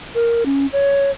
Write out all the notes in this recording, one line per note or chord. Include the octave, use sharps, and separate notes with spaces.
A#4
C#4
C#5